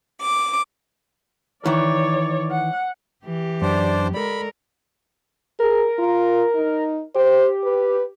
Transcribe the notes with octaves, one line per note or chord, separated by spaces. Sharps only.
D6
D#3 E3 C#5 D5
F#5
E3 G4
F#2 D4 C5 D5
G#3 A4 A#4 D5 B5
G#4 A#4
F4
D#4
G4 C5
B4